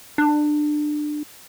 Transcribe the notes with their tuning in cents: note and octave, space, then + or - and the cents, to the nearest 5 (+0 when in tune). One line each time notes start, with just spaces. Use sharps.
D4 +25